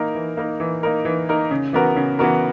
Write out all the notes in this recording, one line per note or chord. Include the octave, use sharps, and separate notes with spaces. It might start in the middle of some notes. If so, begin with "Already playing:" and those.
Already playing: E3 A#3 D#4 A#4
E3
A#3 D#4 A#4
E3
A#3 D#4 A#4
E3
A#3 D#4 A#4
C#3
E3 B3 F#4 A#4
C#3
E3 B3 F#4 A#4